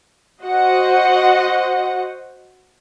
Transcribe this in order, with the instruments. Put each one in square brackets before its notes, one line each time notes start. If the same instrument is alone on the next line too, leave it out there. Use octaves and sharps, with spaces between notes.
[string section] F#4 C5 D#5 F#5